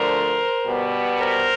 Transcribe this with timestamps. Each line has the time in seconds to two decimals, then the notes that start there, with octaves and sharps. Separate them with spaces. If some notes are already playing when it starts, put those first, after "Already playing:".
Already playing: D2 D3 F3 A3 D4 A#4 C5
0.65 B2 G3 B3
1.19 A#4 C5